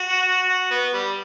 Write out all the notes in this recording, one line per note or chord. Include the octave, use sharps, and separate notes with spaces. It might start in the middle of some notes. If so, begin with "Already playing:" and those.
Already playing: F#4
F#4
B3
G3